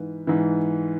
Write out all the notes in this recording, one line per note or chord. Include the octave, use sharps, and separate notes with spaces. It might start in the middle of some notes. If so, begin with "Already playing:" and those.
Already playing: G#2 E3 B4
G#2 E3